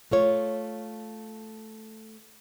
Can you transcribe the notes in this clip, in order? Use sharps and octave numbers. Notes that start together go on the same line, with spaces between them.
A3 F4 C#5